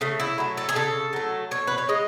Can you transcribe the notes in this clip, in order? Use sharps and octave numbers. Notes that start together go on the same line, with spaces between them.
C#3 A3
E4
F#3 A3
A4
G#4
C#3 A4
F#3 A3
B2 C#5
B4
C#5
G#3 D#5